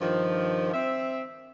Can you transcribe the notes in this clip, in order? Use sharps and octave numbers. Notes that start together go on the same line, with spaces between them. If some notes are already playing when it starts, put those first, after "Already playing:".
G2 D#3 F3
C4 E5